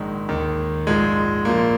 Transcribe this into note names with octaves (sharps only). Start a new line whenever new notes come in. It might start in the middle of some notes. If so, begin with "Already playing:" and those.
Already playing: A#1 G#2 D#3 G#3
D#2 D#3
A#1 G#2 F3 G#3
A#1 A#2 F3 A#3